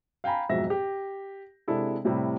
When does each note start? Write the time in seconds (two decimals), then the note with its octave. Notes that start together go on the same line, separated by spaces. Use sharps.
0.24 F5 G5 G#5 A#5 B5
0.49 F2 G#2 B2 F#3 E5 A#6
0.70 G4
1.68 C3 G#3 D4 E4 A4
2.05 A2 C3 G3 E4